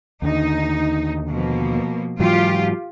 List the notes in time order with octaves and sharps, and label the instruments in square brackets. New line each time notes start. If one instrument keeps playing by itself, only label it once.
[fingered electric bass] D#2 D3 [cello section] D#4
[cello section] B2 F3 A#3
[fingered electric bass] G#2 E3 F#3 [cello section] F4 G4